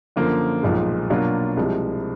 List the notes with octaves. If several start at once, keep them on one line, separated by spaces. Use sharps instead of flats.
F#2 D3 F3 A#3
B1 A#2 F3 G#3
B2 F#3 A#3 D4 F4
C2 C3 F3 G#3